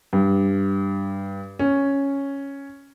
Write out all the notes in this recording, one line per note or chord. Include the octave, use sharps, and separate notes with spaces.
G2
C#4